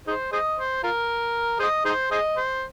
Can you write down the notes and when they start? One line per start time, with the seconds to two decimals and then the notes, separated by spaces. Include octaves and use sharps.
0.07 D#4 G#4 C5
0.32 G#4 C5 D#5
0.58 C5
0.83 F4 A#4
1.59 G#4 C5 D#5
1.85 D#4 G#4 C5
2.11 G#4 C5 D#5
2.37 C5